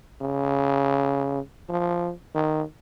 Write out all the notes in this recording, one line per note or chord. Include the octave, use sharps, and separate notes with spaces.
C#3
F3
D#3